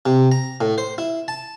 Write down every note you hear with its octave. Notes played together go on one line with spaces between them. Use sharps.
C3
A#5
A2
C5
E4
A5